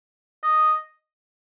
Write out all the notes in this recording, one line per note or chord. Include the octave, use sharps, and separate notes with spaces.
D#5